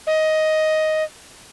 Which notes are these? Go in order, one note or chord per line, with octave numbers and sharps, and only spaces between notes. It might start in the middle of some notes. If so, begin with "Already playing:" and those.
D#5